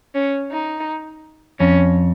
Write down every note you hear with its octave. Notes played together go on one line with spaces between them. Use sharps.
C#4
D#4
F2 C#4